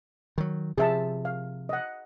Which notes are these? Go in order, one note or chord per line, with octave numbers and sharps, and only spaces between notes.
D#3 F#3
C3 F3 G#4 E5 A5
F5
D#5 F#5